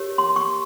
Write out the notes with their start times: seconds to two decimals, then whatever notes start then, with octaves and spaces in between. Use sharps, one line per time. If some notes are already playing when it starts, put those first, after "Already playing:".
Already playing: G4 A#4 C#5
0.18 C6
0.36 C#6